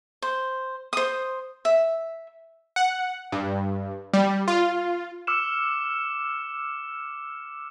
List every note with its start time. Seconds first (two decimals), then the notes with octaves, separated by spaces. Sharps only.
0.22 C5
0.93 C5 D#6
1.65 E5
2.76 F#5
3.32 G2
4.14 G3
4.48 F4
5.27 D6 E6 F6 C#7 E7